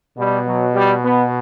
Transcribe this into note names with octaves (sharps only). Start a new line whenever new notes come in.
B2 G3
F#3
G3
B3